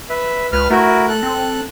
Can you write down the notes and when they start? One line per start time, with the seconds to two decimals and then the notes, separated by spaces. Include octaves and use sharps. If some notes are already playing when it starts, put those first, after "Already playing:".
0.10 B4 E5
0.53 C#2 B4 F6
0.70 A3 E4 F#4 A#4
1.09 A4 F#6
1.23 C4